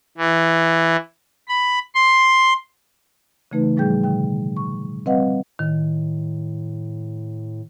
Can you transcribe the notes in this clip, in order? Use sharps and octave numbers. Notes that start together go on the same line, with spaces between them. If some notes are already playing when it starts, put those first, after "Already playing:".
E3
B5
C6
C#3 E3 A3 D#4 B4
A2 F3 G3 G#4 G5 G6
B2 D3 G5
C#6
G3 C4 B4 D#5 F5 F#5
A2 D#3